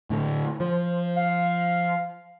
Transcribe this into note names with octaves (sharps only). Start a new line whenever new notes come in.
A2 D3 A3
F3 C5
F5